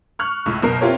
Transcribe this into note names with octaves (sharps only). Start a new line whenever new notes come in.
C#6 F6 F#6
C#2 A2
F#1 B2 A#4 C7
C4 E4 F4 G4 A#4 C#5